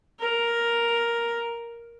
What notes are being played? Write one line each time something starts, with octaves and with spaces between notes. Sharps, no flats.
A#4